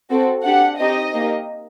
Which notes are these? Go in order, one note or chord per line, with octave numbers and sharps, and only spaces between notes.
C4 F#4 A4
D4 G4 F#5
C4 D#4 G4 D#5
A#3 D#4 G4